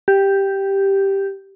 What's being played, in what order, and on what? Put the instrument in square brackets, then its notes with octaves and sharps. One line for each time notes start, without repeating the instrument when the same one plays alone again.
[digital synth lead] G4